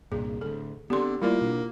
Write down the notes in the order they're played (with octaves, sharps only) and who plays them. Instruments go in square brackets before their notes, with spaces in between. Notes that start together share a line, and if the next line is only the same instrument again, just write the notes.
[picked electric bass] C2 G2 A#2 [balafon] G#4
[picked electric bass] D1 D2 [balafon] A4
[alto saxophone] D3 [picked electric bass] B3 C4 [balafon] G4 C6
[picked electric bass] G3 A3 [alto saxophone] A#3 [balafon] E4 F4 D5
[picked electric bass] B2 D4